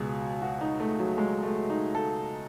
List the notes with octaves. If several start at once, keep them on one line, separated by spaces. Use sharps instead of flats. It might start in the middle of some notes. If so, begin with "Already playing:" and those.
Already playing: C#2 B2 G#4
F#4
D#4
A3
F#3
G#3
A3
D#4
A4